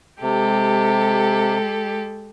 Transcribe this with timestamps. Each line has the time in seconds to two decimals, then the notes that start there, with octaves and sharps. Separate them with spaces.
0.22 C3 G#3 G4 A4